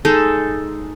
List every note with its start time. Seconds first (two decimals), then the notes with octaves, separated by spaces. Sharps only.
0.05 G#3 D#4 A4